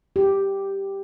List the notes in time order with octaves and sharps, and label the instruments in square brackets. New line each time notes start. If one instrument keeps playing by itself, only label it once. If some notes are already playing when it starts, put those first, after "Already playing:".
[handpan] G4